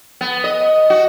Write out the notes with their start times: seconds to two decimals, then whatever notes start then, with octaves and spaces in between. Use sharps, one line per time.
0.21 B3
0.44 D#5
0.90 F#4